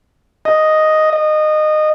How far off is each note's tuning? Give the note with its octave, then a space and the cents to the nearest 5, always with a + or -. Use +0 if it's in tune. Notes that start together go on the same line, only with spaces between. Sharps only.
D#5 +0
D#5 -20